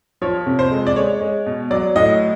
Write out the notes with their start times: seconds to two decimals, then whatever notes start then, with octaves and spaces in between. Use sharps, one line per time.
0.22 F3 C#5
0.46 C3
0.59 C5
0.71 G#3
0.87 D5
0.96 G#3 C#5
1.20 G#3
1.46 B2
1.71 F#3 D5
1.96 A2 D#5